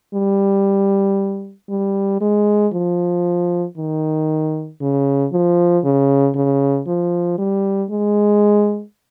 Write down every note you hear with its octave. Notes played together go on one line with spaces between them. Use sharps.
G3
G3
G#3
F3
D#3
C#3
F3
C#3
C#3
F3
G3
G#3